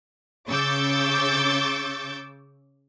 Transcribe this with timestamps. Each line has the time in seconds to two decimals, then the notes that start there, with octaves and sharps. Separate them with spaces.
0.49 C#3 C#6 D6 E6 G6 A6